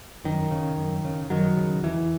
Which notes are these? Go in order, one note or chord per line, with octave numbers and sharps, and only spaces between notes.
F#2 D#3
C#3
F#2
C#3
F#2 D#3 F#3
C#3
E2 E3